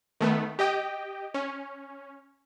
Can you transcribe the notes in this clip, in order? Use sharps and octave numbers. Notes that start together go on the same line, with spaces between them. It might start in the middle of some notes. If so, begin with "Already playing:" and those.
D#3 A3 B3
G4 D#5 G5
C#4